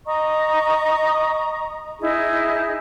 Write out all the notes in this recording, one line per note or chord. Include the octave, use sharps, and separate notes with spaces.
D#5 A#5 C#6 D#6
D#4 E4 G#4 D#5